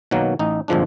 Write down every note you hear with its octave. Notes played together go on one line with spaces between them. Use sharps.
B2 D#3 F#3 A#3
A1 D#4
G1 F2 A#2 F3 G#3 D4